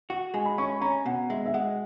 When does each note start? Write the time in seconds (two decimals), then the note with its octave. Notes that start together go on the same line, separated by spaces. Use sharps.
0.10 F#4 F#5
0.34 G#3 G#5
0.45 B5
0.58 C#4 C#6
0.70 B5
0.81 C#4 A#5
1.06 B2 F#5
1.30 G#3 E5
1.46 E5
1.54 G#3 F#5